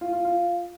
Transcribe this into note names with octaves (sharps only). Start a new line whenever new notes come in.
F4
F4
F4